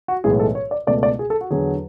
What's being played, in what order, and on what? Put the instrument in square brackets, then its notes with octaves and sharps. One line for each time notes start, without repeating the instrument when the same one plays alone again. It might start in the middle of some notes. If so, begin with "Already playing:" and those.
[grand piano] F#4
B1 A2 E3 G#3 B3 G#4
A4
C#5
D5
C#2 B2 A3 D5
D5
G#4
A4
F#4
E2 D3 F#3 G#4